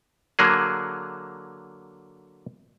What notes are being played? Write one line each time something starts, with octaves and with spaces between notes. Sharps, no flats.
D3 F#3 A#3 G#4